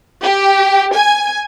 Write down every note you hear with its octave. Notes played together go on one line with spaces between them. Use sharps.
G4
G#5